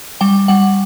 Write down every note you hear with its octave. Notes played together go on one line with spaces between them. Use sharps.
G3 G5
G3 F#5